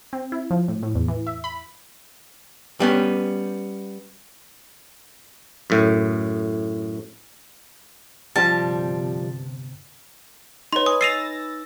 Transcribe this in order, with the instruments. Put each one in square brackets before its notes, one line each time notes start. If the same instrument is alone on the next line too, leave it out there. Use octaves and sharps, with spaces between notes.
[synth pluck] C4
E4
F3
A2
A2
E2
E3
E5
B5
[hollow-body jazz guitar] G3 B3 C#4
[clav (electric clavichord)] F#2 A2
[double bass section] G1 C3 [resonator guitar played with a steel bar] F3 G3 [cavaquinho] A5
[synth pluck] D#4 B4 [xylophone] C#5 C6
[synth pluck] G#5 [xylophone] D#6
[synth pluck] E6 A6 A#6 [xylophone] C7 D#7 F7